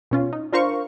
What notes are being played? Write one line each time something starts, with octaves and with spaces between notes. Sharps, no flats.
B2 C#4 F4
D#4
D4 F4 A#4 C5 F5 C#6